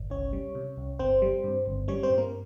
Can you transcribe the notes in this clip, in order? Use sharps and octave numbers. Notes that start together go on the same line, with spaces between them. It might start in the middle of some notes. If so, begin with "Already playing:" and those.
Already playing: G1
C2 C#4 C#5
G3
C3
C2
G1 C4 C5
G3
G2
G1
G3 C#4 C#5
C4 C5
G2
A#3 A#4